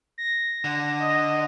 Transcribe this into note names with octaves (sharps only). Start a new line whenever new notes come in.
A#6
D3
D#5